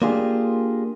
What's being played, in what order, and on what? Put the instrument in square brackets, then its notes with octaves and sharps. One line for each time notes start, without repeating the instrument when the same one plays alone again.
[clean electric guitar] A#3 D4 F4 G4 G#4